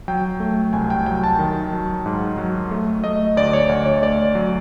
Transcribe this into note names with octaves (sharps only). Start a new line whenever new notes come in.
F#3 G5
A3
C2 G#5
G5
F#3 G5
A5
D#3
F#3
G#2
F#3
A3
A3 D#5
D2 D5
C#5
D2
C#5
A3 D5
F#3